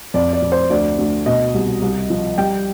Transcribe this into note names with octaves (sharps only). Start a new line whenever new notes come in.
F2 D5
D5
F2
C5
D2 D5
D2
B2 D#5
C2
C2
F3
G3 G5